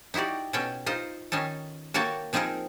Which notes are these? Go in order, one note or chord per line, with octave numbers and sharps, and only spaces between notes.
D#4 E4 F#4 G4 D5
B2 C#4 A4 G5
D#4 F4 C5
D#3 C#4 D#4 A4
A#3 F#4 A4 C#5 G5 A5
F3 C4 D#4 F4 G#4 A#4